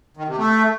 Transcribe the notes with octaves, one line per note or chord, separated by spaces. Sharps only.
D#3
C3
A3